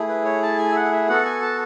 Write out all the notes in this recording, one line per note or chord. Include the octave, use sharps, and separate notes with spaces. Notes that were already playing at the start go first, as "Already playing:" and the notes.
Already playing: A3 E4 G#4
B4
C#5
A5
G#5
E5
F#5
E5
B3 F#4 A4 F#5
G#5
A5